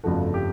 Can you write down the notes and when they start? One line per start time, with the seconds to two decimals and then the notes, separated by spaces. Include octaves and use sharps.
0.04 G1 F2 C#3 F3 A3 F#4
0.34 G4